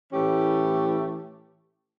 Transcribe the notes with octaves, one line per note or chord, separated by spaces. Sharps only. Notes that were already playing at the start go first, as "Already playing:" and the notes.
A2 E3 A3 C#4 G4